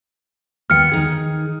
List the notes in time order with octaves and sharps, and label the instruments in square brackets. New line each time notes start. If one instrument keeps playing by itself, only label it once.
[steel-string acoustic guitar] D#2 B3 G5 [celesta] F6 C#7
[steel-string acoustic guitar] D#3 D#4 G#4